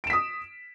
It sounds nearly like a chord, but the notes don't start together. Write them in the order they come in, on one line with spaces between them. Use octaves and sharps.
D7 E7 B6 D#6